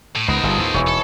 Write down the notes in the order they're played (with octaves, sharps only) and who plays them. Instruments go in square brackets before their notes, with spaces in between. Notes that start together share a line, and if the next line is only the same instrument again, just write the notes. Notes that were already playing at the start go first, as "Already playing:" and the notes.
[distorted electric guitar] A2
[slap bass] C#2 [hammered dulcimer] B3 D#4 [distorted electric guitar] A#4 C5
[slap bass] G1 G3 [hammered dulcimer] F3 G#4 A4
[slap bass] D#2 A2
[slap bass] E1 D#2 [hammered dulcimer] E3 C#5
[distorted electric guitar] A4